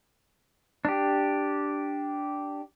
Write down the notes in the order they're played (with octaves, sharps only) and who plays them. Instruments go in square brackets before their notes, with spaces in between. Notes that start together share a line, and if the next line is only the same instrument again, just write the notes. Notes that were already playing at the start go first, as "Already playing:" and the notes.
[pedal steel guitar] D4 G4